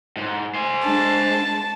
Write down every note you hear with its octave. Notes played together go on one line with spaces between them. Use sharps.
G#2
C5 G#5
G#3 D4 A5